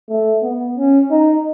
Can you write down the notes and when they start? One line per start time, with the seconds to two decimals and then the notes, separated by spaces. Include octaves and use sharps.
0.09 A3
0.43 B3
0.77 C#4
1.11 D#4